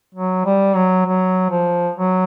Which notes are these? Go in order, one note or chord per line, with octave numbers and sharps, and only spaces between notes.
F#3
G3
F#3
F#3
F3
F#3